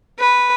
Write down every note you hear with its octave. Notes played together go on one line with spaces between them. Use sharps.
B4